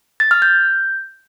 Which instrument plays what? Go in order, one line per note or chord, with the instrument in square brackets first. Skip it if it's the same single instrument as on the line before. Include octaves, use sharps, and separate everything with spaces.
[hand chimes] A6
F6
G6